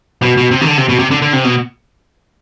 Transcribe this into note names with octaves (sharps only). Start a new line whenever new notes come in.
B2
B2
C3
D#3
D3
C3
B2
C3
D3
D3
C3
B2